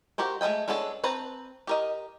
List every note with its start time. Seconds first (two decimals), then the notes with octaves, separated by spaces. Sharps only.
0.18 F#4 G4 A#4 C5
0.41 G#3 A3 B4 D#5 G5
0.68 G#3 B3 C#4 D4 A4
1.04 C4 B4 A5 A#5
1.67 G4 A#4 D#5